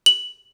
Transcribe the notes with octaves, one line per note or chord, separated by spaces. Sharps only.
F#7